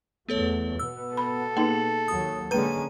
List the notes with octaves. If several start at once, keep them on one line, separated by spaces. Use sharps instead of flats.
E2 A3 B3 A4 C#5
B2 B3 E6
A4 B5
A#3 D#4 G#4
D#2 F#3 D#6
D3 G#3 A#3 C#4 B4 A#5 D#7